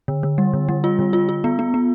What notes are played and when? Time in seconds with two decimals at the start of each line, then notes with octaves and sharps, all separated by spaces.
0.08 D3
0.23 D3
0.38 G3
0.54 D3
0.69 G3
0.84 F4
0.99 D3
1.13 F4
1.29 F4
1.44 B3
1.59 B3
1.74 B3